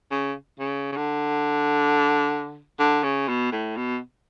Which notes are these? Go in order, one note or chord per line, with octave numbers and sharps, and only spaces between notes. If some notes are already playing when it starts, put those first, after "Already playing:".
C#3
C#3
C#3
D3
D3
C#3
B2
A2
B2